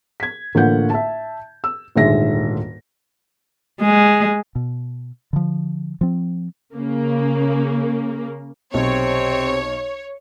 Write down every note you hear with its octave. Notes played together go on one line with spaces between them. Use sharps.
G#6 B6
A1 D3 A#3 F4 F#5 G6
E5 A5
E6
D#1 D2 G#2 G#3 E5 A#6
G#3
B2
D3 F3
F3 C4
C#3 A#3
B1 C3 C4 C#5